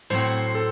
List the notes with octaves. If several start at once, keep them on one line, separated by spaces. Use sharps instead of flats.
A2 F#3 C4 C5
A4